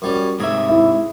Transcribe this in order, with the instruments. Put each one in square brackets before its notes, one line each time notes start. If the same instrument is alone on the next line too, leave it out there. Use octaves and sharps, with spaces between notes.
[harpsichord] F#2 G3 C#4
[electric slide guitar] G#2 C3 E5 [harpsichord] G#4
[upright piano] E4